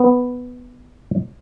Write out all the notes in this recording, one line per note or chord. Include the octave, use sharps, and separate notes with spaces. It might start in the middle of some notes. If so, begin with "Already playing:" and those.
Already playing: B3